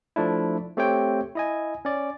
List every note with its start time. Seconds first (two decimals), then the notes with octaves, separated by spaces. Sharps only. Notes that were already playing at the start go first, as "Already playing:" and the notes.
0.16 F3 A3 D4 E4
0.77 A3 C4 G4 C5 C#5 G5
1.35 E4 D#5 G#5
1.85 C#4 D5